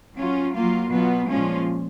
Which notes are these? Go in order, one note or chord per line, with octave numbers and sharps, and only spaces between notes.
F#3 C#4 F4
F#3 A#3 F4
B2 F#3 B3 F4
A#2 F3 G#3 C#4 F4